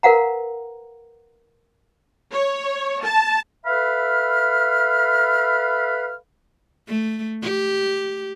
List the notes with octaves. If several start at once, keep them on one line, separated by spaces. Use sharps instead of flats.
A#4 B4 F5 F#5 A#5
C#5
A5
A4 B4 E5 F5 B5 F6
A3
G4